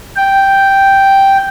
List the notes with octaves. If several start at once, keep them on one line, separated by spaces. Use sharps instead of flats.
G5